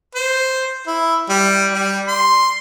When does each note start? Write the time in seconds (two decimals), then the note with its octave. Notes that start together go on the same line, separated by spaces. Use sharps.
0.15 C5
0.87 E4
1.30 G3
1.71 G3
2.07 C6